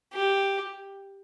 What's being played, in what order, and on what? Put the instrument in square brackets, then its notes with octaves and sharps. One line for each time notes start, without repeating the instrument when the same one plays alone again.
[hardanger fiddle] G4